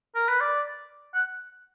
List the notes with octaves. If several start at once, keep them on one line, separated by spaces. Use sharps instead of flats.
A#4
B4
D5
F#5